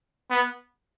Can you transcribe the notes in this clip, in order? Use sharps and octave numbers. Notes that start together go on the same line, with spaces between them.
B3